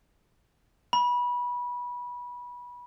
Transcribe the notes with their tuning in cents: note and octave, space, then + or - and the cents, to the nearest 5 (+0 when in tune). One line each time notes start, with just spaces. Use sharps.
B5 -20